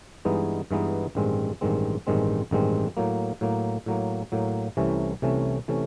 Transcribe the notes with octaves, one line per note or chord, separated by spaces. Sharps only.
G2 E3 G#3 B3 D#4
G2 E3 G#3 B3 D#4
A1 G2 D#3 G#3 C4
A1 G2 D#3 G#3 C4
A1 G2 D#3 G#3 C4
A1 G2 D#3 G#3 C4
A2 F#3 A#3
A2 F#3 A#3
A2 F#3 A#3
A2 F#3 A#3
C2 C3 E3 A3 C#4
C2 C3 E3 A3 C#4
C3 E3 A3 C#4